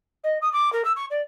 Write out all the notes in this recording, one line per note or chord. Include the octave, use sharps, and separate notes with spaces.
D#5
D#6
D6
A#4
E6
C#6
D5